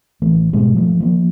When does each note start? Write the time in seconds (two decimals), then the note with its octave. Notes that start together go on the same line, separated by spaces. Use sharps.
0.22 A1 E3 A3
0.53 G#2 B2 G3 G#3
0.75 F3 F#3 A3
1.00 F3 A#3